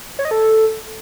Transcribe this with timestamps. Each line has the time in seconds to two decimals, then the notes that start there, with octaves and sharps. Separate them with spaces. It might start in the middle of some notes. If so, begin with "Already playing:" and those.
0.19 C#5
0.25 D#5
0.31 A4